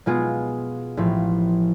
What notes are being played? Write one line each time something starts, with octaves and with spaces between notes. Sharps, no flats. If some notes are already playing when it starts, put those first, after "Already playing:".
B2 G#3 B3 F4 G#4
A1 A2 F3